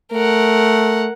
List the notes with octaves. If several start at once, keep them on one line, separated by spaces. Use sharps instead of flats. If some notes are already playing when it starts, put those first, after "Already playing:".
A3 A#4 F#5